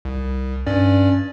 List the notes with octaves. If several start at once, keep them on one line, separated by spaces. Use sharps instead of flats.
C2
G2 C#4 D5